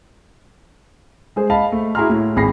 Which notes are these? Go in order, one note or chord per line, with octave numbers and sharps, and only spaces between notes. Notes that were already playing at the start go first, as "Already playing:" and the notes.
G#3 G#4 C5
D#5 F5 A5 B5
A3
E4 F#4 G#4 A#5 C6 F6
A2
G#1 G#4 B5 A#6 C7